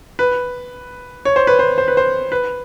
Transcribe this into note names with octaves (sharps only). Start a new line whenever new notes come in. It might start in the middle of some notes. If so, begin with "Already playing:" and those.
B4
C#5
C5
B4
C5
C5
B4
C5
B4